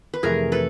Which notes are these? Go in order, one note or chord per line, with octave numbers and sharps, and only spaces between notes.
B4
F2 C3 E3 A3 G#4 A#4
A4 B4